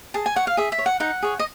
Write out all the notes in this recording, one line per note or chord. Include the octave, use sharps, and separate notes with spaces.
G#4 A5
G#5
C#5 F#5
F5
G#4 E5
E5
C#5
F#5
D#4 F#5
G#4 C#5
D#5